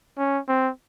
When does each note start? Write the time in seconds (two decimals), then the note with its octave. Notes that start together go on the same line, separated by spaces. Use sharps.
0.18 C#4
0.48 C4